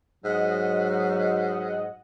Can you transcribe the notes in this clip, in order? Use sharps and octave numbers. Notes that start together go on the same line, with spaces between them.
G#2 F#3 D#5 F#5